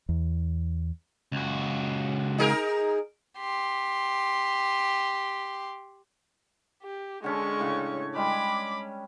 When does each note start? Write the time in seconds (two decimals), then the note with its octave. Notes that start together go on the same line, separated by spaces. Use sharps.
0.09 E2
1.32 C#2 F#4
2.38 D#4 G#4 A#4
3.38 G4 C6
6.83 G4
7.24 D3 G#3 C#4 A4 C#6
7.59 A2 C#3
8.16 G3 G#3 B5 D6